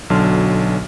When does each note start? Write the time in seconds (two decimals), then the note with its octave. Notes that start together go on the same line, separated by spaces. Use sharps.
0.10 B1 D3 F#3 A5 C6 F6